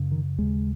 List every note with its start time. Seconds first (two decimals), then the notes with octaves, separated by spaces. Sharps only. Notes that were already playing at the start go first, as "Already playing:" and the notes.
Already playing: F#2 C#3
0.11 D#3
0.38 D#2 C#3 G#3